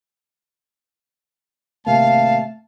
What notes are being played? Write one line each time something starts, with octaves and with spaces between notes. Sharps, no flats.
G#1 C3 A3 A#3 F5 A5